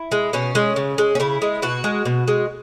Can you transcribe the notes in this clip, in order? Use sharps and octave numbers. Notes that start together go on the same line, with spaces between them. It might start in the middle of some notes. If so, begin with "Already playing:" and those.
Already playing: E4
G#3
B2 C#4
G#3
C#3
G#3
C#4
C#3 E4
G#3
B2 F#4
G#3
B2
G#3